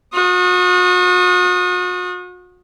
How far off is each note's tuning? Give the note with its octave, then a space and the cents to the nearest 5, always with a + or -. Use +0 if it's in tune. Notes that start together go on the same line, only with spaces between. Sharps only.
F#4 -40 D#6 +0